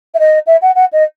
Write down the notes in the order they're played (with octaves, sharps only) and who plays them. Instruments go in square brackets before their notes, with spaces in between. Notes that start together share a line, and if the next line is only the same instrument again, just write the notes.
[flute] E5
D#5
E5
F#5
F#5
D#5